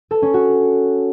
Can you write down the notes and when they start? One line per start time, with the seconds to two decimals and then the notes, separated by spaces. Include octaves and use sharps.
0.11 A4
0.22 C#4
0.34 F#4